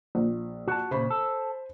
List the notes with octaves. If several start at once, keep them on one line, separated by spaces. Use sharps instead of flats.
A#1
F#4 A5
A#2 C#3 C5 B5
A4